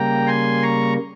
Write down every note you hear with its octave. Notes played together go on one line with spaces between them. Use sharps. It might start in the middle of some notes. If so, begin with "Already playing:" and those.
Already playing: C#3 G3 A#3 G5 A#5
G#5 C6
A#5 C#6